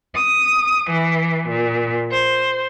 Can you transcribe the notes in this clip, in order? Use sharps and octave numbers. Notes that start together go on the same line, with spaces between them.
D#6
E3
A#2
C5